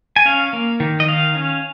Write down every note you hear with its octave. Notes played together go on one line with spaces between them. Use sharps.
G#5
C#4 F5
A#3
D#3
D#5
D#3 F5
C#4